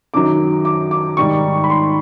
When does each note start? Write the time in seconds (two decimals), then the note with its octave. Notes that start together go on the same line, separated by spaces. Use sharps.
0.14 F#2 D#3 F#3 D6
0.65 D6
0.91 D6
1.17 G#2 D#3 G3 C#6
1.64 B5
1.70 C6